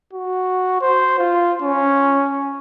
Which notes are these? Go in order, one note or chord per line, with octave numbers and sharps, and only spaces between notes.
F#4
C5
F4
C#4